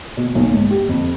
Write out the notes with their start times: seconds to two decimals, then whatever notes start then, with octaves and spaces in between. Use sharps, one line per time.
0.17 B2
0.35 B1
0.54 G#2
0.71 G4
0.89 F2